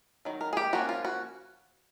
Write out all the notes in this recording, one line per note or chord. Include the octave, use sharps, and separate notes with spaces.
D#3 F#3
A#4
G#4
G4
F3 A#3 C#4 F#4
F4
F#4